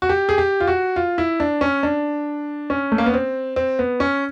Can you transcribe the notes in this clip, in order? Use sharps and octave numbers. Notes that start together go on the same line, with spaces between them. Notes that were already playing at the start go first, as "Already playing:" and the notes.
F#4
G4
G#4
G4
F4
F#4
F4
E4
D4
C#4
D4
C#4
A3
A#3
B3
C4
C4
B3
C#4